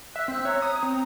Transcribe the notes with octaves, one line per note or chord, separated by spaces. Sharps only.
E5 E6 F#6
C4
C#5 A#5
D#6
C4